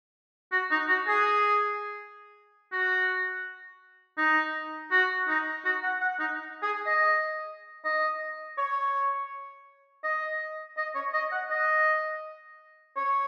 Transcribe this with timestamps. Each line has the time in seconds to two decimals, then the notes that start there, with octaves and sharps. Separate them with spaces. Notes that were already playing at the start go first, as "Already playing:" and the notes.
0.52 F#4
0.71 D#4
0.89 F#4
1.07 G#4
2.72 F#4
4.18 D#4
4.91 F#4
5.28 D#4
5.65 F#4
5.83 F#5
6.01 F#5
6.19 D#4
6.63 G#4
6.86 D#5
7.85 D#5
8.58 C#5
10.04 D#5
10.77 D#5
10.95 C#5
11.13 D#5
11.32 F#5
11.51 D#5
12.96 C#5